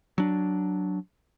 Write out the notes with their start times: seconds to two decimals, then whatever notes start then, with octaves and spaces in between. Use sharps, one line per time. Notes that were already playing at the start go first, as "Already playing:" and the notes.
0.18 F#3 D4